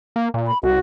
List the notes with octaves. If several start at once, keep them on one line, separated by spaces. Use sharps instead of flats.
A#3
A#2
B5
C2 F#4